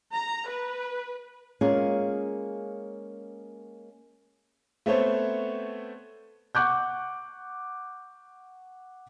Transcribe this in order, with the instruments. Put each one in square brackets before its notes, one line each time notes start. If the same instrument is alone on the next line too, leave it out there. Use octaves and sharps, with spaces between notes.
[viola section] A#5
B4
[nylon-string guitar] G#3 A#3 C#4 F4 G#4 A#4
[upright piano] A3 B3 C4 A4 C5 C#5
[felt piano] F#5 C#6 D6 F#6 G6